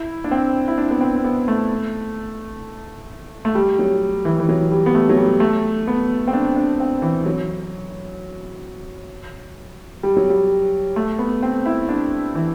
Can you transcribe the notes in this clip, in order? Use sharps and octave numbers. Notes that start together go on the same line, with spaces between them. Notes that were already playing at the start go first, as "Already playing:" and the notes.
Already playing: E4
D4
C4
E4
D4
B3
C4
C4
B3
A3
A3
G3
F#3
E3
E3
F#3
G3
B3
A3
F#3
G3
A3
B3
C4
D4
D4
C4
E3
F#3
G3
F#3
G3
A3
B3
C4
E4
D4
E3